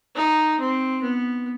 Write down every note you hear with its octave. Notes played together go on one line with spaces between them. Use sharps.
D#4
C4
B3